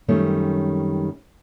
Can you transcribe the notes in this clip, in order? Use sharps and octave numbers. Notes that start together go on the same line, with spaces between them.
F#2 D#3 G3 A3 C4 C#4